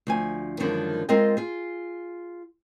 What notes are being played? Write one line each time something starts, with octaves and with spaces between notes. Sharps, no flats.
D2 F3 G#5
F#2 D3 D#3 F3 G#3
G#3 C4 F4 A#4 D#5 G5
F4 G#4